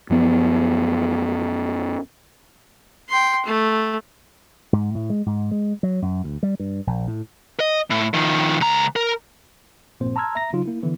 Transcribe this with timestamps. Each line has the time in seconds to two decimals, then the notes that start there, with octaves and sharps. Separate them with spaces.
0.10 F#2 F3 B3
3.09 G5 C6
3.45 A3
4.73 G#2
4.95 A2
5.10 G#3
5.26 G#2
5.51 G#3
5.83 F#3
6.02 F#2
6.24 D2
6.43 G3
6.60 G2
6.87 A#1
7.08 A2
7.60 D#5
7.90 A2
8.14 D#3 F3
8.60 C#2 A#5
8.96 A#4
10.00 A#1 G2 A#2 A#3 C4 C5
10.16 A5 A#5 C6 E6 F6 G#6
10.35 E5 A#5 A#6
10.53 C#3 F#3 D#4 F4
10.66 A#3 E4
10.83 D3 E3 B3 E4